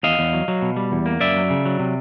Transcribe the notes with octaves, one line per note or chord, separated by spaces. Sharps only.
E2 D#5 F5
E2
F#3
F#3
B2
G3
E2
A#3
F#2 D5 E5
F#3
C#3
F#3
C3